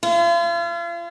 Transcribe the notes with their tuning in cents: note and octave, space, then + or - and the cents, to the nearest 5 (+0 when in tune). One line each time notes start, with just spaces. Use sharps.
F4 -40